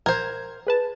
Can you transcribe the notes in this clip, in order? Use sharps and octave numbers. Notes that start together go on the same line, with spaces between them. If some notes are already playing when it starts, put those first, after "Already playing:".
A#1 A#4 C5 G#6
G#4 B4 A5